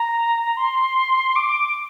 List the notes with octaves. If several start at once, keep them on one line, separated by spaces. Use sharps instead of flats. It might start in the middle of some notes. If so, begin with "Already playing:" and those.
Already playing: A#5
C6
D6